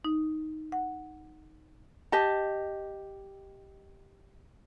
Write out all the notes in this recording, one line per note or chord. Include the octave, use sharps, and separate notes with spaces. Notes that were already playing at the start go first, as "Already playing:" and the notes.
D#4
F#5
G4 D#5 A5